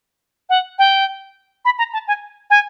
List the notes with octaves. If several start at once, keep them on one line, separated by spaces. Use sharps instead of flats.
F#5
G5
B5
A#5
A5
G#5
G#5